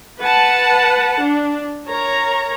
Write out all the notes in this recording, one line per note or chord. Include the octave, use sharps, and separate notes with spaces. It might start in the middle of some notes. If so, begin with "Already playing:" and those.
B4 F#5 A5
D4
A#4 C#5 A#5